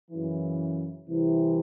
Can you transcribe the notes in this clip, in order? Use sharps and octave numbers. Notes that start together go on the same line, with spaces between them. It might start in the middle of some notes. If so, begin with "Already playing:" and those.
F#2 C#3 E3
C2 C3 E3